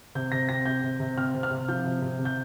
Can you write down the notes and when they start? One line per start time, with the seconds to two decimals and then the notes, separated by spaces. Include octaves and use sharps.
0.15 C3 G6
0.32 C3 A#6
0.49 C4 A#6
0.66 C3 G6
0.83 C3
1.00 C3
1.17 C4 F6
1.35 C3
1.43 F6
1.51 C3
1.68 F3 G6
1.85 C3
2.02 C3
2.19 C3
2.25 G6